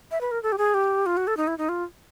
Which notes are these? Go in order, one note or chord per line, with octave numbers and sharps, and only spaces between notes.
E5
B4
A#4
A4
G4
G#4
G4
F4
F#4
A4
D#4
E4
D#4
F4